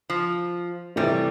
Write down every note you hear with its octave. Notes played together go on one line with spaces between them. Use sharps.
F3
C3 E3 G3 A3